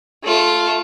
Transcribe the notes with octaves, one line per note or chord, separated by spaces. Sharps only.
A3 F4